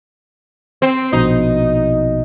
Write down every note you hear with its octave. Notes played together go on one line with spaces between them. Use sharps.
C4
A#1 B2 D#4